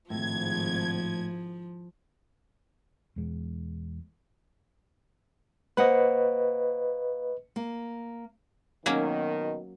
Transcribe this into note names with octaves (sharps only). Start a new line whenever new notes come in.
G#1 A2 F3 G#6
E2 B2 G#3
A#3 B4 C5 D#5 F#5
A#3
B2 D#3 F#3 A#3 C#4